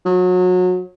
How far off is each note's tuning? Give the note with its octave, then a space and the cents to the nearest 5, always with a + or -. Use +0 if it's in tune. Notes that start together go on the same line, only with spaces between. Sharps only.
F#3 -30